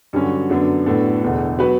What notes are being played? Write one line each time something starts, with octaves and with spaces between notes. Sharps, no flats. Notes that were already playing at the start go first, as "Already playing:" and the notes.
G2 D3 F#3 C#4 F#4
F#2 D3 F#3 B3 D4
A2 F#3 B3 D4 A4
E1 E2 D3
F#3 B3 F#4 B4